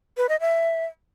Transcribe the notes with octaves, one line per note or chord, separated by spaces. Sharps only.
B4
D#5
E5